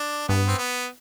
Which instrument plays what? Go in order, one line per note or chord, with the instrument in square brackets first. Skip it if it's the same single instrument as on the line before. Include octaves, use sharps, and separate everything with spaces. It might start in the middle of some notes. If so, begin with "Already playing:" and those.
Already playing: [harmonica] D4
[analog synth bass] G2 [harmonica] B3
[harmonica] C4
B3